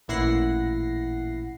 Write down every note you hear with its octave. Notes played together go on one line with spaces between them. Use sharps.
A1 A#2 E4 F#5 A#6 C7